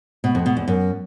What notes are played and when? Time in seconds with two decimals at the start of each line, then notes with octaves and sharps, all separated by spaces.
0.24 B2
0.35 F2
0.46 B2
0.57 E2
0.68 F#2